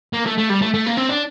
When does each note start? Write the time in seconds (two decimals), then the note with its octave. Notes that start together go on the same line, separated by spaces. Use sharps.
0.14 A#3
0.26 A3
0.38 A3
0.50 G3
0.62 A3
0.74 A3
0.87 A#3
0.97 C4
1.10 D4